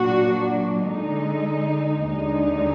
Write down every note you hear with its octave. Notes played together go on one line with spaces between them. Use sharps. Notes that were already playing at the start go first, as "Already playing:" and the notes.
Already playing: A#2 F#3 A#3 D4 F#4
D3 G#3 D#4
D#2 D3 G#3 D#4